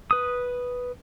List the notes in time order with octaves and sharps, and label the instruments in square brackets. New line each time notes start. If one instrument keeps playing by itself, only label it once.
[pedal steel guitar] B4 D#6